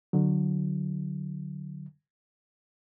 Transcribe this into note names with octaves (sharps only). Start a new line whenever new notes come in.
D3 F#3